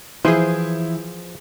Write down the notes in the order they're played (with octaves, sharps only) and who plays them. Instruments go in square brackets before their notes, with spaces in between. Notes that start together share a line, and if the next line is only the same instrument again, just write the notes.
[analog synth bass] E3 [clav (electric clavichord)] F3 B4 G#5 [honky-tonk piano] E4 [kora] G#4 C5